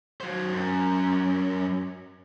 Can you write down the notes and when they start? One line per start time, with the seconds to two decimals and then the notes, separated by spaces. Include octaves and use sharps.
0.21 F#3 C5
0.53 F#2